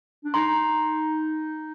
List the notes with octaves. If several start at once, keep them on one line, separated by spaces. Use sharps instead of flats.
D4
D#4 A#5 C6